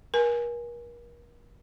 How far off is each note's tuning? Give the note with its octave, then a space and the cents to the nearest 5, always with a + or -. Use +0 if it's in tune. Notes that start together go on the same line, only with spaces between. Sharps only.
A#4 +40 G#5 +0